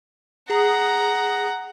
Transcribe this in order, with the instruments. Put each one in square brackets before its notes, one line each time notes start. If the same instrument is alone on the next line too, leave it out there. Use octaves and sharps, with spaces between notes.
[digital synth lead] G#4 [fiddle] F#5 A#5